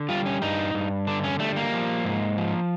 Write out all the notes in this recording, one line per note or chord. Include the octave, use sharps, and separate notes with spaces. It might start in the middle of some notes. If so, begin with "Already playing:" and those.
Already playing: D3
G3 F4
C#4
G2 D#4
G2
D3 D4
C#4
G3 A3
A#3
F3
G#2
F3